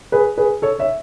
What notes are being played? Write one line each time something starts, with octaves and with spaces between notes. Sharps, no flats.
G#4 B4
G#4 B4
A4 C#5
C#5 E5